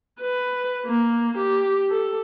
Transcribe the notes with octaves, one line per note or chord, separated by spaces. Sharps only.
B4
A#3
G4
A4